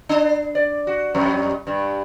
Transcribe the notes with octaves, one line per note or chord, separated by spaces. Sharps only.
D4
D5
F#4
F2 G3
G2